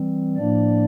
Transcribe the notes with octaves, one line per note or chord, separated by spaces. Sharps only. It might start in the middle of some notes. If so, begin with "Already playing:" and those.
Already playing: E3 G3 C4
A2 F3 A#3 D4 D5